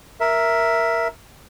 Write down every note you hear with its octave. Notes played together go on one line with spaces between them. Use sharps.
A#4 E5